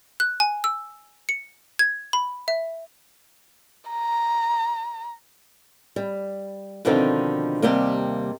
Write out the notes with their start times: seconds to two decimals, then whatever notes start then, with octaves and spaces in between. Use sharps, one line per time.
0.20 F#6
0.40 G#5
0.64 E6
1.29 C#7
1.79 G#6
2.13 B5
2.48 E5
3.90 A#5
5.96 G3
6.85 B2 D3 D#3 F3 C4 D#4
7.62 D#2 C3 G3 A#3 G4 F#5